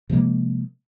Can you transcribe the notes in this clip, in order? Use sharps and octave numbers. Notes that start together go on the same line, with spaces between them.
C3 F3 G#3 A#3